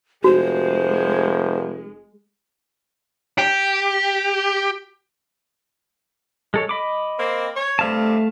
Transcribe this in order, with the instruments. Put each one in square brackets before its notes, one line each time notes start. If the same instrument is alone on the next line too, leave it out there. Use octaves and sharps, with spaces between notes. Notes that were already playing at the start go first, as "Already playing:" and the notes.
[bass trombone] F1 [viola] G#3 [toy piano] F#4 [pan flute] C5
[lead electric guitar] G4
[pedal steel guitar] G#3 A4 C#5
D#5 B5 D6
[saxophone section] A#3 C4
C#5
[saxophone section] G2 C3 [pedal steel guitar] A3 F5 A5